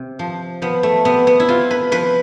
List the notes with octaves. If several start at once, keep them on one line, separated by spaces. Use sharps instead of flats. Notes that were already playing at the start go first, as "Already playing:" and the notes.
Already playing: C3
F3
F3 B3
A3
C3 B3
B3
E4
C3 F4
B4
F3 B4